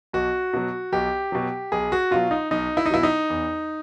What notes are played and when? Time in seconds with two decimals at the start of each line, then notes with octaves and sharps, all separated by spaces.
0.13 B1 F#4
0.53 B2 F#3
0.92 B1 G4
1.32 B2 F#3
1.72 B1 G#4
1.92 F#4
2.11 B2 F#3 F4
2.31 D#4
2.51 B1 D#4
2.77 E4
2.86 D#4
2.90 B2 F#3 E4
3.03 D#4
3.30 E2